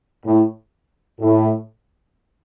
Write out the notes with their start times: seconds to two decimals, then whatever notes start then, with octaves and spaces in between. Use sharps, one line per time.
0.25 A2
1.20 A2